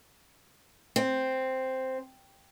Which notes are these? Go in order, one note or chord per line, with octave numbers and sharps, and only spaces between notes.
C4